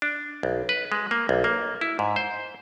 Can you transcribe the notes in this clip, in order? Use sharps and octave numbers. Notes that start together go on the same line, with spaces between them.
D4
B1
B4
G#3
A#3
B1
A#3
E4
G#2
C5